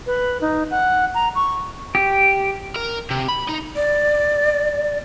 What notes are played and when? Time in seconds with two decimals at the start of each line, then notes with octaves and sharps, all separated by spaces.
0.07 B4
0.41 D#4
0.71 F#5
1.14 A#5
1.35 C#6
1.95 G4
2.76 A#4
3.11 C3
3.29 B5
3.49 D#4
3.76 D5